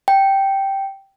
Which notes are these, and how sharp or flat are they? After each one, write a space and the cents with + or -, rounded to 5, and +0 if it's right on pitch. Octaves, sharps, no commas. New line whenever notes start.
G5 -5